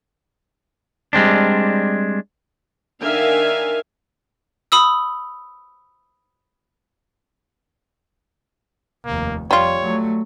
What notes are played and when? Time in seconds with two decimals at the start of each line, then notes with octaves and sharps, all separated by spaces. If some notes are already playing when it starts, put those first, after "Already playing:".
1.13 G3 G#3 C4 D4
3.01 D#3 D4 A#4 E5 F5 G#5
4.72 B5 D#6 E6
9.05 F1 D#2 A#3
9.51 F2 G3 F4 C#5
9.82 F#3 A3